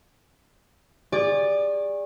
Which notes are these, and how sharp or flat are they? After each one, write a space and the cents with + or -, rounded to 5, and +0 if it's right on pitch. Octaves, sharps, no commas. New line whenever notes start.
G#4 -35 D5 +0 C#6 -25